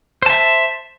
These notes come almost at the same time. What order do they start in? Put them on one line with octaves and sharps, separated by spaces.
C5 A5 E5